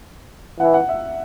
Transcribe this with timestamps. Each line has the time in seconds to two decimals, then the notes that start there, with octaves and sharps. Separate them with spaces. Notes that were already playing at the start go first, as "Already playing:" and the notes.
0.60 E3 F#5
0.74 F#5
0.89 E5